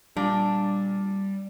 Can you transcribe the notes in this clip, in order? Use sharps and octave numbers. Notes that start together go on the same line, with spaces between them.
A#2 G3 D4